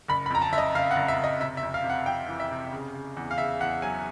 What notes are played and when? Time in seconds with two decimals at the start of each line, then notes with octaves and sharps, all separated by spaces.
0.08 F#1 B5
0.26 B5
0.30 F2 A#5
0.42 A5
0.52 F#1 E5
0.58 D#5
0.75 F#1 F5
0.91 F#5
0.96 F#1
1.08 E5
1.19 F#1 D#5
1.40 C3 E5
1.57 E5
1.63 F2
1.74 F5
1.84 C3
1.90 F#5
2.06 F2 G5
2.28 E3
2.40 E5
2.51 C3
2.73 C#3
2.94 C#3
3.17 E2
3.31 F5
3.38 C#3 E5
3.60 E2 F#5
3.82 F#3 G#5